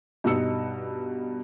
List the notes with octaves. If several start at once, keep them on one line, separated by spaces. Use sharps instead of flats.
G2 B2 D#4 D#5 E6 C#7